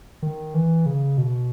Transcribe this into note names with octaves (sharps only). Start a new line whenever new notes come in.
D#3
E3
C#3
B2